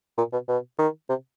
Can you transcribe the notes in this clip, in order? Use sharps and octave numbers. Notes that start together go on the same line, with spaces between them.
A#2
B2
B2
D#3
C3